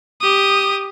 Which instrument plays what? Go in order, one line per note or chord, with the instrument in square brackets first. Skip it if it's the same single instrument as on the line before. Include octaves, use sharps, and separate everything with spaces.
[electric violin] G4 D#6